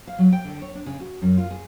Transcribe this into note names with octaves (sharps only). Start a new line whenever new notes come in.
F5
F#3
G5
D3
C#5
D4
C#3
F#4
F#2
F4
G#4